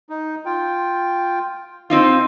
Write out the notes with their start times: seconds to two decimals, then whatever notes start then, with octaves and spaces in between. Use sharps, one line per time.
0.10 D#4
0.45 F4 G5
1.90 C4 D#4 F4 C6